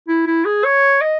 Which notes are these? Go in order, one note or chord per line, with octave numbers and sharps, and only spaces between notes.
E4
E4
G#4
C#5
D#5